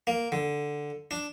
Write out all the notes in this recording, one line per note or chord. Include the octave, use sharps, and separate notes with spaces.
A#3
D3
D4